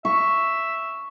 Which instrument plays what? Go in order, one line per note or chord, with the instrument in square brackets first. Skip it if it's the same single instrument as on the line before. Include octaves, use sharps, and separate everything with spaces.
[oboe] E5 [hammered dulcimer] C#6